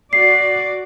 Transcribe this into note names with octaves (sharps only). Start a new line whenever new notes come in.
F#4 D5 C7